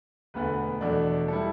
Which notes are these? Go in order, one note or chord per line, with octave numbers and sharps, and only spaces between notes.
E1 D2 D3 B3 B4
E2 B2 A3 D4
G3 E4 A4